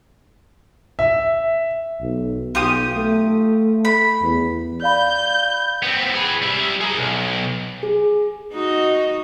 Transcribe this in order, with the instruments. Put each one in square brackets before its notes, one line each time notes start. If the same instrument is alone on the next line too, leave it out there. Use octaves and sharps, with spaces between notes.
[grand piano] E5
[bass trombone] B1
[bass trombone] B1 [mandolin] F4 G4 D#6
[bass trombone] A3
[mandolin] B5
[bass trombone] E2
[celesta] D5 F5 B5 [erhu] G6
[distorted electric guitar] B3 C4
G#4 B4
G3 E5
G#4 A#4
B1
[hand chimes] G#4
[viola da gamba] D#4 F#4 D#5